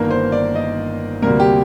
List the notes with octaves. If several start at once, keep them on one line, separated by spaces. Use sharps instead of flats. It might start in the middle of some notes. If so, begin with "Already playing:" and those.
Already playing: G1 G2 D#3 A#3 A#4
C5
D5
D#5
D2 C3 G3 A#3 A#4
G4